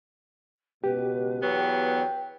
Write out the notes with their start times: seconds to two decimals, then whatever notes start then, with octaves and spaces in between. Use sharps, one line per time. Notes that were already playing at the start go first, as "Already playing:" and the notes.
0.84 C#2 B2 G4 B4
1.43 E2 F#3 B3 B4 G5